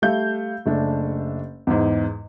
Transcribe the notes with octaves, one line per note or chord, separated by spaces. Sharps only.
G3 A3 F5 G6
F#1 A3 D4
E2 G#2